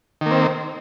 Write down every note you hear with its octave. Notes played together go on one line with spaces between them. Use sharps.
D#3 A#3 C4